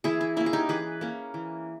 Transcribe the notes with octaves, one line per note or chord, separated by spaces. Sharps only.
E3 E4 G#4
E4
A#3 C#4 E4
G#4
D#4 G4
E3 G#4 B4
A#3 C#4
E3